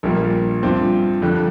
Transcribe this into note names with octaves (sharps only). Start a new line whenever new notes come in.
A#1 A#2 G3 A#3
G2 F3 C4
F2 D3 G3